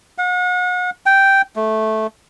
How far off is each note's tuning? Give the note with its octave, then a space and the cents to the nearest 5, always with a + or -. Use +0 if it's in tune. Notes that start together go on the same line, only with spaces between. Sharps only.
F#5 -40
G5 -5
A3 -10